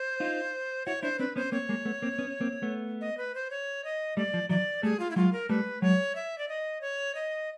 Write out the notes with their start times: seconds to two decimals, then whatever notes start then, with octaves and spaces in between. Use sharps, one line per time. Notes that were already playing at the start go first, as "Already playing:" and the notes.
Already playing: C5
0.20 D#4 F4
0.86 E4 F#4 C#5
1.02 D4 E4 C5
1.19 C4 D4 B4
1.36 B3 C#4 C5
1.52 A#3 C4 C#5
1.69 G#3 A#3
1.85 A3 B3
2.02 A#3 C4
2.18 B3 C#4
2.41 A#3 C4
2.62 A3 B3
3.01 D#5
3.18 B4
3.35 C5
3.51 C#5
3.85 D#5
4.17 G3 A3 D5
4.34 F3
4.49 E3 F#3 D5
4.83 G3 A3 G#4
5.00 F4
5.11 E4
5.16 F#3 G#3 F4
5.33 A#4
5.49 G3 A3 B4
5.82 F#3 G#3 C#5
6.15 E5
6.38 D5
6.49 D#5
6.81 C#5
7.15 D#5